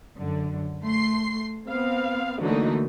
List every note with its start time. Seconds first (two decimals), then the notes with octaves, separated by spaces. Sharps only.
0.16 F#2 D3
0.83 A3 C6 C7
1.67 B3 C4 F5
2.39 D3 E3 F#3 A3 A#3 D#4